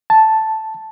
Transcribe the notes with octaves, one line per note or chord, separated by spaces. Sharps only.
A5